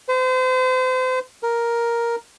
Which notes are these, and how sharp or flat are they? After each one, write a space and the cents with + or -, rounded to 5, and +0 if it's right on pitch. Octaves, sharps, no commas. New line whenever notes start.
C5 -35
A#4 +5